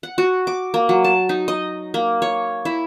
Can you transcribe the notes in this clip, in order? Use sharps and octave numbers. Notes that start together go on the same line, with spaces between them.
F#5
F#4
D6
A#3
F#3
A5
D#4
D#5
A#3
C#5
E4